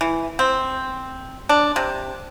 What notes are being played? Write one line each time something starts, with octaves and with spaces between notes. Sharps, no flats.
E3
C4
D4
C3